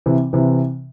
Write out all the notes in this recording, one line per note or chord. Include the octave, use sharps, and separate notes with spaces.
C3 E3
C3 E3